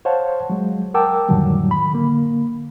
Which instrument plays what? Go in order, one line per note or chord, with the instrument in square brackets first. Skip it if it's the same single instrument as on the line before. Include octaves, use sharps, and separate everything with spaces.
[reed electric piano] C5 C#5 F5 F#5 A5
F#3 G#3
A#4 F#5 G5 A5 D6 E6
F2 A2 D3 D#3 F#3 G3
B5
D3 A#3